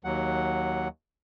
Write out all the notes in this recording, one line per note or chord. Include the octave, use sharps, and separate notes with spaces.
D#2 F#3 F#5